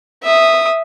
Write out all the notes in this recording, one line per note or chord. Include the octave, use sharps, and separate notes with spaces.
E5 D#6